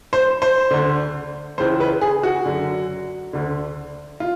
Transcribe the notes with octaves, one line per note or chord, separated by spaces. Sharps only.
C5
C5
D2 D3
C#2 C#3 E3 C5
B4
G#4
F#4
F#2 D3
D2 D3
F4